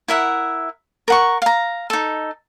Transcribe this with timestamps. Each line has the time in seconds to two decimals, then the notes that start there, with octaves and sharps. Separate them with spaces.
0.08 E4 A#4 E5 F#5
1.08 A#4 F#5 C#6
1.42 F5 A#5
1.90 D#4 A4